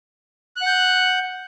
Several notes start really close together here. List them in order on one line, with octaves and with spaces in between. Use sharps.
F#6 F#5 G6